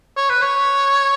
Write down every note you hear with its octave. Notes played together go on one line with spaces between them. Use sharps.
C#5
B4
C#5